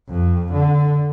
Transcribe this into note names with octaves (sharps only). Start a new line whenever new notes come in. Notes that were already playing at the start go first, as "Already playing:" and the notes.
F2
D3